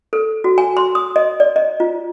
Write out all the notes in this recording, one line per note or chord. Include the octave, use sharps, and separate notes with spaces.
A4
F#4
G#5
C6
D#6
D#5
D5
D#5
F4